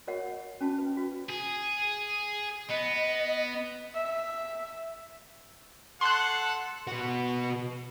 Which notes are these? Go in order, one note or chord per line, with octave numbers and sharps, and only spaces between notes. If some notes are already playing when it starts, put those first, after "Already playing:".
F#4 A#4 C#5 D#5 F#5
C#4 F#4 A5
B4
F#4
G#4
B3 D#5
E5
A4 F#5 C6 F#6
B2 F#4